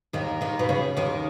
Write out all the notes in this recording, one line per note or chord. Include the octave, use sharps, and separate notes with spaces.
D#2 D#3
D#2 D#3
B2
C#3
D#2 D#3